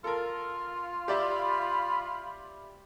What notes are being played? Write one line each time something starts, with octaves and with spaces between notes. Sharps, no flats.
F4 A4 A#4
G4 D5 E5 B5